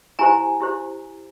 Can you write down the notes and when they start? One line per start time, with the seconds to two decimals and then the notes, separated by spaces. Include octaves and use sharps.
0.19 E4 G4 C5 G#5 A#5
0.60 E4 G4 C5